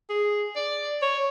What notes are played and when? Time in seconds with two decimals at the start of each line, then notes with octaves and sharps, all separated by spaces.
0.10 G#4
0.56 D5
1.02 C#5